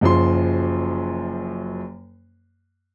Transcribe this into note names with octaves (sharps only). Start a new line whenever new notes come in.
F#1 F#2 F3 C6